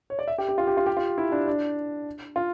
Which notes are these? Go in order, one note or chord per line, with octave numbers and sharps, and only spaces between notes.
C#5
D5
E5
G4
G4
F4
G4
F4
G4
F4
E4
D4
D4
F4